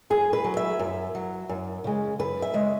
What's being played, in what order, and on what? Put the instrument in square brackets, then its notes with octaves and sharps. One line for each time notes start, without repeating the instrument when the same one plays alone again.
[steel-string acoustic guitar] F#2 G#4
B4
F#3
E5
F#2
F#3
F#2
C#3 G#3
F#2 B4
E5
C#3 G#3